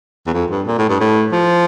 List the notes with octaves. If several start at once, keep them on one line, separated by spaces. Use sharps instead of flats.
E2
F2
G2
A#2
A2
G2
A2
F3